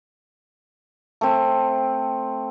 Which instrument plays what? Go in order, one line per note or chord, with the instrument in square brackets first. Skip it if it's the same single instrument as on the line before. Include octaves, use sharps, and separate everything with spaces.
[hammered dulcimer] A3 C4